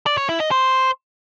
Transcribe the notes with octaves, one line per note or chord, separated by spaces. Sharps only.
D5
C#5
E4
D#5
C5